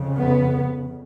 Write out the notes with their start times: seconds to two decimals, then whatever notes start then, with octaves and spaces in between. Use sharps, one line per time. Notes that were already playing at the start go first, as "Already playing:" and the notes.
Already playing: F2 C#3
0.15 B3